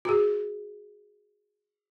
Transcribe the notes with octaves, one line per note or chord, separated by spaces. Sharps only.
F#4 G#4